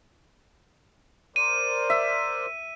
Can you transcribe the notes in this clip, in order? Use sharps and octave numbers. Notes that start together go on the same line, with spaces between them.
A#4 C5 D5 D#7
E5